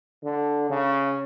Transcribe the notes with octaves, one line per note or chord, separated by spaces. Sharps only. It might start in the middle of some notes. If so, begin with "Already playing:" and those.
D3
C#3